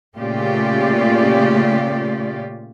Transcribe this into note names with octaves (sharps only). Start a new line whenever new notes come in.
A#2 C#3 A3 F4 G4 D5